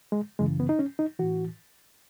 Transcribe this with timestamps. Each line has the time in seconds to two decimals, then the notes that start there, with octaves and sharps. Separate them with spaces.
0.12 G#3
0.39 F#2 C#3 E3 G#3
0.60 B3
0.69 D#4
0.79 C#4
0.99 D#4
1.19 A2 E3 F#4